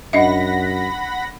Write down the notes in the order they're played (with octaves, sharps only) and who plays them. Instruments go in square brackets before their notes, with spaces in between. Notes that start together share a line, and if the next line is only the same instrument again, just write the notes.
[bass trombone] F#2 [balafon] D4 D#5 E5 [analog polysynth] F#5 B5 A#6